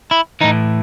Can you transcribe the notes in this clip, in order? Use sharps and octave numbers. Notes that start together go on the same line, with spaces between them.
E4
A2 E3 D#4